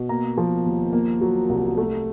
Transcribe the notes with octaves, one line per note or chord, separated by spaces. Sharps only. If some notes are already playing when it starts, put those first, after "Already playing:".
Already playing: B2
A#3 A#5
F3
D#2
A#3
F#3
C2
A3